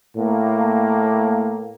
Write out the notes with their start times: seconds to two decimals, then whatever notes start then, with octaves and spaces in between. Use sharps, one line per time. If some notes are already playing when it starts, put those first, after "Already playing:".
0.17 A2 A#3